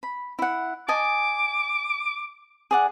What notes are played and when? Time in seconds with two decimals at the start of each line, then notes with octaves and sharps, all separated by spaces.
0.03 B5
0.39 E4 F#5
0.88 D#5 G#5 A5 D6
2.71 G#4 D5 F#5